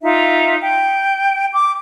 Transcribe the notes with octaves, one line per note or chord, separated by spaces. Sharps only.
D#4 F4 E5
G5
D6